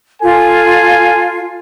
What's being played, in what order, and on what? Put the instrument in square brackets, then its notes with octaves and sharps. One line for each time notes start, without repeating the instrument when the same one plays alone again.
[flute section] F4 [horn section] A4 G#5